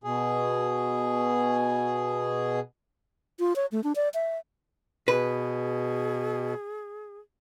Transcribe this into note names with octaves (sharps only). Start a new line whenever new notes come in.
B2 G#4
F4
C#5
A3
D4
D5
E5
B2 G#4 B4